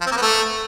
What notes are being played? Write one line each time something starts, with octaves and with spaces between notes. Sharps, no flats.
F3
C4
A#3
B3
A3